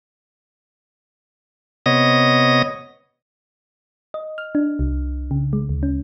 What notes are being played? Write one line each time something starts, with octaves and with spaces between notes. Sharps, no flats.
C3 B3 C#5 D#5 D#6 A#6
D#5
F6
D4
C2
C#3
G#3
D2
C#4